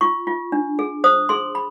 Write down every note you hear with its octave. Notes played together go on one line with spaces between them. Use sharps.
F4 C#6
F4
D4
G#4
C5 D#6
G#4 C6
B5